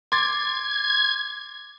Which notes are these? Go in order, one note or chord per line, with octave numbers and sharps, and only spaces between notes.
C6 D6 G#6 A6